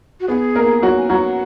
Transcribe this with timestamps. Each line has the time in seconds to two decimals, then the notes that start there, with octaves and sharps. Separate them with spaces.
0.20 F#4
0.28 B3 G#4
0.55 A#3 A#4
0.82 F#3 F#4
0.97 G#5
1.09 F#3 F#4 F#5